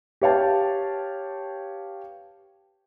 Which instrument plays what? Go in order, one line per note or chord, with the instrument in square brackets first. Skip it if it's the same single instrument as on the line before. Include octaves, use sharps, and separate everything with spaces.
[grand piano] G4 B4 C#5 F5 G5 A5